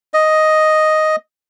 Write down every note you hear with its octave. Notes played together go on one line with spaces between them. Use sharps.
D#5